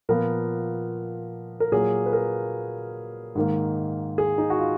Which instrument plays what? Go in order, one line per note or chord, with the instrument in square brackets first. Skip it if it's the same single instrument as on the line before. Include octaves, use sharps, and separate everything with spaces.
[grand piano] A#2 F3 B3 A#4
A#4
A#2 F#3 A#3 G#4
B4
A#4
G#2 D#3 A#3
G#4
D#4
F#4
F4